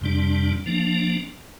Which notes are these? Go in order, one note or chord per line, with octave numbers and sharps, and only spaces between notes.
F2 C3 G3 D4
F3 A#3 D4